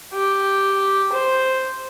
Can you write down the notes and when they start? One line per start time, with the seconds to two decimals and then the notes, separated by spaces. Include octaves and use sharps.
0.14 G4
1.13 C5